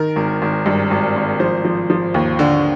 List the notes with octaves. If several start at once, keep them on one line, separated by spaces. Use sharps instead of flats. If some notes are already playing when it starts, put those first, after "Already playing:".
Already playing: D#3 A#4
G#1
G#1
G2
G#1
G#1
F3 C5
F3
F3
D#2
D3